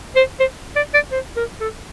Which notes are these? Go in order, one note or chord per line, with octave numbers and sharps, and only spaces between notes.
C5
C5
D5
D5
C5
A#4
A4